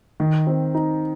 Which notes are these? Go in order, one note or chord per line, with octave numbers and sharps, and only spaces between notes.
D#3
C4
D#4